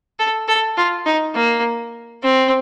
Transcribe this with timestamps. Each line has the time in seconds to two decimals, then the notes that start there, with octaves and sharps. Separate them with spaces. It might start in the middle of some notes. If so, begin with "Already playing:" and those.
0.19 A4
0.48 A4
0.77 F4
1.06 D#4
1.35 A#3
2.23 C4